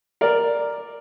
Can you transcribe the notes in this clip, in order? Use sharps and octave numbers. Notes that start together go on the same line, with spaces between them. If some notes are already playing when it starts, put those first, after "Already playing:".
A#4 D5